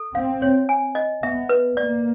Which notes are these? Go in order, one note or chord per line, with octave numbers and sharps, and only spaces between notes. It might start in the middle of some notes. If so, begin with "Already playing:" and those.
Already playing: A4
C4 F5
C#5
G#5
D#5
B3 E5
B4
A#3 D5